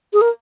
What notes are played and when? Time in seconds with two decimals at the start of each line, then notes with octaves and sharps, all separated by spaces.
0.13 G#4
0.21 A#4